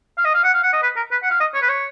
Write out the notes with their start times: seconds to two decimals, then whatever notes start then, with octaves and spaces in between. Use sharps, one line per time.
0.18 F5
0.25 D#5
0.34 F5
0.44 F#5
0.54 F5
0.63 F#5
0.73 D#5
0.82 B4
0.96 A#4
1.11 B4
1.23 F#5
1.30 F5
1.40 D#5
1.54 C#5
1.62 B4
1.69 C#5